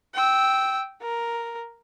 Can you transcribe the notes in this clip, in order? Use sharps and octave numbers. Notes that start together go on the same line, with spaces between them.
G5 E6
A#4